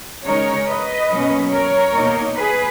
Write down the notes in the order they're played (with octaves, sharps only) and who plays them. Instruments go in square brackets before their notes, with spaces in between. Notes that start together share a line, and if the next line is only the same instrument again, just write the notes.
[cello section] C#3 G#3 D#4 A#4 C#5
B4 D#5
B2 F#3 A#3 C#4
A#4 C#5
B2 A#3 D#4
G#4 B4